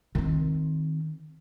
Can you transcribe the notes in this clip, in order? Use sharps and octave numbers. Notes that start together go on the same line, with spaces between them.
D#3 C4